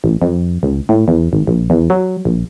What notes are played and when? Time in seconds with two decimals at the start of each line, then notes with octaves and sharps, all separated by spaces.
0.04 A1
0.22 F2
0.63 C#2
0.89 A2
1.08 E2
1.33 G#1
1.47 A#1
1.70 E2
1.90 F#3
2.25 A#1